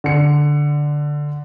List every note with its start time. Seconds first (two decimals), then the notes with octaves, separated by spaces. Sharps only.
0.04 D3 C#7